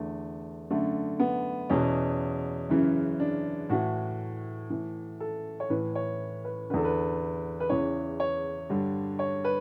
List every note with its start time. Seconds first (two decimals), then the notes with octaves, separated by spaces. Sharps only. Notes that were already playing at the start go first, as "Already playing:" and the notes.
Already playing: E2 D3 A3
0.70 F#2 D3 A3
1.20 B3
1.70 E2 B2 C#4
2.69 F#2 C#3 E3
3.20 D4
3.70 A2 E3 F#4
4.70 A2 E3
5.20 A4
5.60 C#5
5.70 A2 E3 B4
5.95 C#5
6.45 B4
6.70 D3 B4
6.74 E2 A4
6.85 B4
7.60 B4
7.69 E2 C#3 E3 C#5
8.20 C#5
8.70 G2 D3
9.19 C#5
9.44 B4